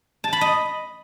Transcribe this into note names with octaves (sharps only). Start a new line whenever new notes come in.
A5
B5
D#5